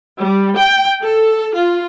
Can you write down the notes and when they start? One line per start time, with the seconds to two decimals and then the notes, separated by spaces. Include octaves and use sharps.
0.21 G3
0.57 G5
1.02 A4
1.54 F4